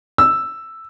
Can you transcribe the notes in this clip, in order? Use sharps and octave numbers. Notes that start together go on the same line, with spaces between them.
E6